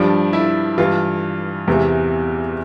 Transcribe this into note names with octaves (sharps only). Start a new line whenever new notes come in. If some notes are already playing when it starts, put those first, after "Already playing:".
Already playing: G2 F3 D4
E4
G2 E3 F4
E2 C3 E3